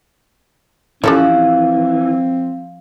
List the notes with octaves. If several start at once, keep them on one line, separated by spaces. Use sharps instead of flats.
E3 F3 C#4 G4 A4 C#5
C4